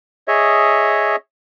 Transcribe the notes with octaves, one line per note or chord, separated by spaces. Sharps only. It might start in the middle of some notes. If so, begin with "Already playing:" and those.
G#4 C#5 D#5 E5